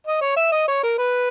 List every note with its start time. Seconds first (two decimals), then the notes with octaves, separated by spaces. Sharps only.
0.07 D#5
0.21 C#5
0.37 E5
0.52 D#5
0.68 C#5
0.83 A#4
0.98 B4